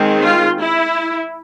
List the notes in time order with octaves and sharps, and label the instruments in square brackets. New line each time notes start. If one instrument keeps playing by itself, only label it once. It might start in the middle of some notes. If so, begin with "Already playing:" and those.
Already playing: [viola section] D#3 G#3 C4
F4
E4